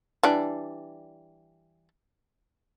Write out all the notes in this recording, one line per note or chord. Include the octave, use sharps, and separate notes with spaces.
E3 G3 D4